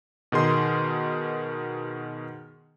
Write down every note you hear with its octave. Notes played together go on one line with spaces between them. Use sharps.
B2 D#3 G#4 C6